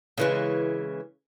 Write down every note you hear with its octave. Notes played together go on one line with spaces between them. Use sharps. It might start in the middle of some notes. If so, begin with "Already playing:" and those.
C#3 E3 G#3